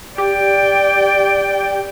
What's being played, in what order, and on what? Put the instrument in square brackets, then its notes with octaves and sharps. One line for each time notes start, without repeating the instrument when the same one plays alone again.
[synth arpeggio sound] G4 [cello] D5 G5